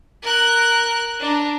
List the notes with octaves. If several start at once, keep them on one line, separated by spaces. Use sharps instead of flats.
A#4 F#6
D4 A#5